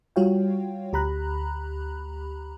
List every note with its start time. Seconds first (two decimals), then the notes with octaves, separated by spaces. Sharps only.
0.16 G3 F4 F#4 C#5 F5 G5
0.93 D2 G4 A#5 B5 F#6